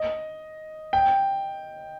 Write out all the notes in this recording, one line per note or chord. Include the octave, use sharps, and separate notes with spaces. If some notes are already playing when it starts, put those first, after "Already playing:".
Already playing: D#5
G5